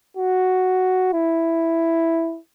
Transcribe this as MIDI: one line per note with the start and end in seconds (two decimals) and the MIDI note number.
0.17 1.13 66
1.13 2.39 64